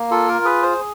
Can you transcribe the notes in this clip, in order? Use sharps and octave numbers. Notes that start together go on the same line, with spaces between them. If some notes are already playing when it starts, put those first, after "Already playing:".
Already playing: A#3
F4 A4
A#4
G#4 B4
C5